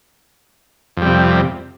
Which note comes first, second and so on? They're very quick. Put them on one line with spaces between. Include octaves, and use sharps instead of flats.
F2 G3 C3